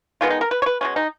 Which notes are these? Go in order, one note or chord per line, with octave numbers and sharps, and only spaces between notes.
D#3 G#3 B3 F4
D#4
A#4
B4
C#5
B4
B2 G#3 C#4
D#4